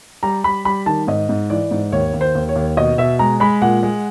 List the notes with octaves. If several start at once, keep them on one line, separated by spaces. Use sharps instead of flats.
G3 A#5
G3 B5
G3 B5
D#3 A5
G#2 D#5
G#2
E3 D5
G#2
D#2 C#5
D#2
C5
D#2
C#5
D#2
B2 D#5
B2 E5
G#3 A#5
G#3 B5
A#2 F#5
G#3